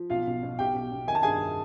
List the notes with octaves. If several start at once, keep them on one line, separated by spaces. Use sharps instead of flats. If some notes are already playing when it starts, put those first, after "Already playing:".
Already playing: F3
B1 F4 F5
B2
B2
B1 G4 G5
B2
B2
D#3 G#5
A5
G2 G#4 G#5